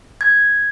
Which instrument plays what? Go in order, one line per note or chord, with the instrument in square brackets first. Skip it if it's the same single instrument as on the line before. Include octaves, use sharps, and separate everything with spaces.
[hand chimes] G#6